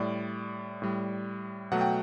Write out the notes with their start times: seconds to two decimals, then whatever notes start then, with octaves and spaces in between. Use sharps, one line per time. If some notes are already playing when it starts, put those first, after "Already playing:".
Already playing: A2 G3 D5
0.82 A2 G3
1.71 B2 F#3 A3 F#5
1.81 G5